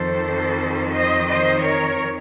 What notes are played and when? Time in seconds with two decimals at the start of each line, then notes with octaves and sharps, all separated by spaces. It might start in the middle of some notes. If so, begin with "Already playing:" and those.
Already playing: F2 D#3 A4 C5
0.94 C5 D#5
1.29 C5 D#5
1.63 A#4 C#5